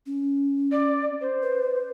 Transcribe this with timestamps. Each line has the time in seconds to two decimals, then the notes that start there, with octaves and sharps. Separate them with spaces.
0.06 C#4
0.72 D5
1.21 C5
1.42 B4